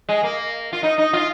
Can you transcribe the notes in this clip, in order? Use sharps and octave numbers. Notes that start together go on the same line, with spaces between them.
G#3
A#3
F4
D#4
D#4
F4